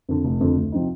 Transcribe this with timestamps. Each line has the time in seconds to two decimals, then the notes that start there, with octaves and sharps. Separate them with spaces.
0.09 F2 D3
0.24 F1
0.41 F2 D3
0.57 D2
0.72 C3 F3 C4 D#4